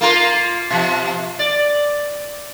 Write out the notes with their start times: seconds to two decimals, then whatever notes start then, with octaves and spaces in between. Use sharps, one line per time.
0.01 A#3 F4 A#4
0.70 B2 F3
1.39 D5